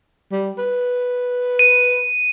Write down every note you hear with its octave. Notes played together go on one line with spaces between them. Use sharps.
G3
B4
D#7